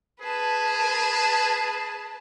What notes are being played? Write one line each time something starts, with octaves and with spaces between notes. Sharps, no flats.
G#4 B4 A5